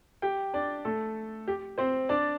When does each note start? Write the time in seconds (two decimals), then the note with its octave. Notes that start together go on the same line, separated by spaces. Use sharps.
0.22 G4 G5
0.54 D4 D5
0.85 A3 A4
1.48 G4
1.78 C4 C5
2.09 D4 D5